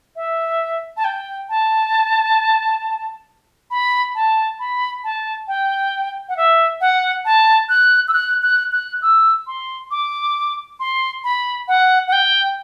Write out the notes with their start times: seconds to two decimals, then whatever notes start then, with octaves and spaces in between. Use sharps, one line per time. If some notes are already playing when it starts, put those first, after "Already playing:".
0.16 E5
0.97 A5
1.04 G5
1.49 A5
3.71 B5
4.15 A5
4.59 B5
5.04 A5
5.48 G5
6.29 F#5
6.37 E5
6.81 F#5
7.25 A5
7.69 F#6
8.08 E6
8.13 F#6
8.43 F#6
8.72 F#6
9.02 E6
9.47 C6
9.91 D6
10.80 C6
11.24 B5
11.68 F#5
12.08 F#5
12.12 G5